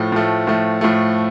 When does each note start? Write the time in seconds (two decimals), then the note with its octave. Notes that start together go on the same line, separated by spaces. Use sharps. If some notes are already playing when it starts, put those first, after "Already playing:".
Already playing: A2 F3 A3
0.12 A2 F3 A3
0.47 A2 F3 A3
0.81 A2 F3 A3